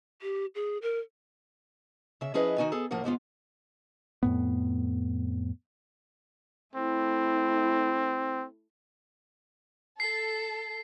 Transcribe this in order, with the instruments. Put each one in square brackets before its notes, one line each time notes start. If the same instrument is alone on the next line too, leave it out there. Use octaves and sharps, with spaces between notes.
[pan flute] G4
G#4
A#4
[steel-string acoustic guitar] C#3 E5
F3 C#4 E4 G#4 B4 D#5
D#3 D#4 F#4 G#5
B3 G#4 A4
A2 F3 A#3 A#4 F#5
D#2 G#2 B3 F4
[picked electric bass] F2 A2 B3
[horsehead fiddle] A3 E4 [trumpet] C4
[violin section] A4 [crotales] C7